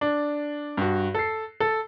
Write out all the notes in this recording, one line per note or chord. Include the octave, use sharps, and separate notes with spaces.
D4
G2 F#4
A4 C7
A4